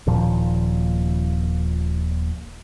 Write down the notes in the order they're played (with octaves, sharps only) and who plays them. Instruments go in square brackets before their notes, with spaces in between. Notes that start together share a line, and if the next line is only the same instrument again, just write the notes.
[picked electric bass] D#1 D#2 A#2 F3